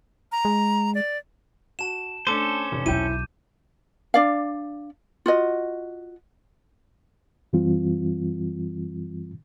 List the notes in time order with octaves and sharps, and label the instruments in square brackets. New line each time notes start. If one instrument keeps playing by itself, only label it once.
[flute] A#5
[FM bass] G#3
[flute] D5
[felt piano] F#4 [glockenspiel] A5 E7
[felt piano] A3 D4 [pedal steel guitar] C#4 A4 C5 [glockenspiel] D6
[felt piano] F1
[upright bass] B1 E2 [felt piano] E4 G5 [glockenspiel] G6 D#7
[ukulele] D4 D5 F5
F4 F#4 D#5
[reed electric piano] F#2 E3 G3 C4 F4